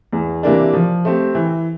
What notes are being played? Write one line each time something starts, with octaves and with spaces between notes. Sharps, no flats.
E2
C3 E3 A#3 D4
F3
A3 C4 G4
E3